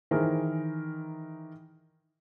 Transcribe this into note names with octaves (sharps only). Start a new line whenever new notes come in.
D#3 E3 G#4 A#4 C5